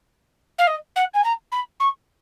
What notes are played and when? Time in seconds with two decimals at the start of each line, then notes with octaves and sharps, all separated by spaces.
0.58 F5
0.67 D#5
0.96 F#5
1.14 G#5
1.24 A#5
1.51 B5
1.80 C#6